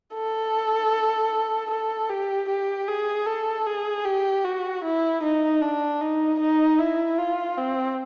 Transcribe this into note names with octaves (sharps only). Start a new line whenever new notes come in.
A4
A4
G4
G4
G#4
A4
G#4
G4
F#4
E4
D#4
D4
D#4
D#4
E4
F4
C4